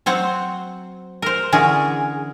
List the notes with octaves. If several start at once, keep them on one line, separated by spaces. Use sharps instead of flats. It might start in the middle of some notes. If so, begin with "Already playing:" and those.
F#3 C4 C5 F#5
A#4 C5
D3 E3 C#4 G#4 A#4